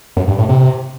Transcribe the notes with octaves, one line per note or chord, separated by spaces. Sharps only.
F#2
G2
A2
C3